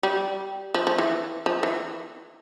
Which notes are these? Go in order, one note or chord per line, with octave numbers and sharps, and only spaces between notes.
G3
F3
F3
E3
F3
E3